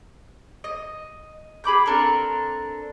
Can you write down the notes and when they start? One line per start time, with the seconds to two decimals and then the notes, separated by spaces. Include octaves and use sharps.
0.64 D#5
1.64 G#4 B5 D6 G6
1.86 C4 D4 A4 A#4